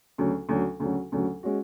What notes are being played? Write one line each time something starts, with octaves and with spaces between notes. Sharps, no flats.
D2 C#3 F#3
D2 C#3 F#3
D2 C#3 F#3
D2 C#3 F#3
G#3 C#4 F#4